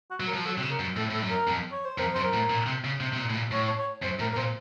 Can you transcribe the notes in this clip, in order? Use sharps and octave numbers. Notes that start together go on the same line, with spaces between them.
F#4
F#3
A#4
F3
F#3 A4
C3
C#3
A#4
F#2
A2 A4
A2 A4
F#2
A#4
F2
C#5
C5
F2 A#4
F#2 C5
A#4
A2
A#2
C3
C#3
C3
C3
A#2
A2
A#2
A2 C#5
C#5
C#5
F#2 C5
A2 A#4
A#4
A#2 C5